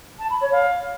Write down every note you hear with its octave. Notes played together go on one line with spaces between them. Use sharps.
A5
B5
C#5
F5